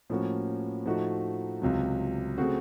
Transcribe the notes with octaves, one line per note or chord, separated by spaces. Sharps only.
A2 F3 A#3 C#4 F#4
A2 F3 A3 D#4 F#4
C#2 C3 F#3
C#3 A3 C4 F#4